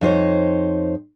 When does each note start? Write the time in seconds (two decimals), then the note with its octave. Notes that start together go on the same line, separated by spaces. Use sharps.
0.01 F2 D#4 C5 C#5